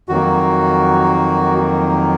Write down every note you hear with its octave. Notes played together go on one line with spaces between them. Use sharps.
F2 D#3 F#3 A#3 F#4